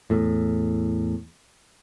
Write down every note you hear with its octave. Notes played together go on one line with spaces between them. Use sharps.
E2 A2